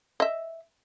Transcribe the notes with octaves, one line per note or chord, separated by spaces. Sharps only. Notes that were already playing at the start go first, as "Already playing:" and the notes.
D#5 E5